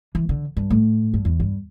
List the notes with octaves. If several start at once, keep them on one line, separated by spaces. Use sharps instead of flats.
E3
D3
G2
A2
G2
E2
G2